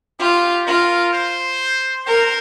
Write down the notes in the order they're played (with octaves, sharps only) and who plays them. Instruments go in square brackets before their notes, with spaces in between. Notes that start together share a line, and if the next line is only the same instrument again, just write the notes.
[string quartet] F4 [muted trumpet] G4
[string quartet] F4 [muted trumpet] A#4
[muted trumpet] C5
[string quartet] A#4 [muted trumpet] C5